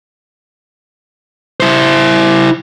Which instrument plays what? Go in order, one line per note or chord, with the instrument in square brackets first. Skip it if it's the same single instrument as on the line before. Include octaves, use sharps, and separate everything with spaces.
[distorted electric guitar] E4 C5